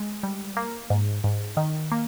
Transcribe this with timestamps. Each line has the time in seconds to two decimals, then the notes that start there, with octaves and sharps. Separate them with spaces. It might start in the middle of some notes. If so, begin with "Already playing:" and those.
Already playing: G#3
0.23 G3
0.57 A#3
0.90 G#2
1.24 G#2
1.57 D#3
1.92 A#3